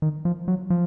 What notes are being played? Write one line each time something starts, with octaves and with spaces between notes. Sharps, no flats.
D#3
F3
F#3
F3